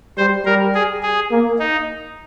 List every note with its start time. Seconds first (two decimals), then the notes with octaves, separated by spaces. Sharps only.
0.17 G3 C5
0.45 G3 A#4
0.75 G#4
1.03 G#4
1.31 A#3
1.59 D#4